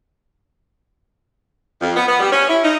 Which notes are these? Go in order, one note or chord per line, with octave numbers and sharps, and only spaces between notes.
F2
B3
B3
G3
C#4
E4
D#4